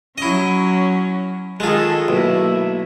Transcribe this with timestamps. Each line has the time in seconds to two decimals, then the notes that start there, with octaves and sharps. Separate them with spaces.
0.18 F#3 C#4 E4 D#5
1.60 D#3 G#3 F4 G#4 A4
2.08 B1 A3 A#3 E4